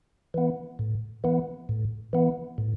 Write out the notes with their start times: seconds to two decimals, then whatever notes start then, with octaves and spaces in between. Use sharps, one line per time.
0.34 E3 B3
0.79 A2
1.24 E3 B3
1.69 A2
2.13 E3 B3
2.58 A2